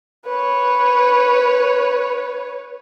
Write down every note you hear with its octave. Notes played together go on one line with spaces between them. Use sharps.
B4 C#5